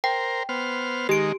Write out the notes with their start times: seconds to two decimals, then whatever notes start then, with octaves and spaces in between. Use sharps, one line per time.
0.04 A#4 C5 G5
0.49 B3 C5 F6
1.09 D#3 G#3 G4 D7